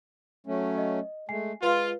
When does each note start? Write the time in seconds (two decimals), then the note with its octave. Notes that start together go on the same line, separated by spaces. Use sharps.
0.47 F#3 A3 C#4
0.78 D#5
1.29 G#3 A3 G#5 C7
1.62 G#3 F4 B4 F5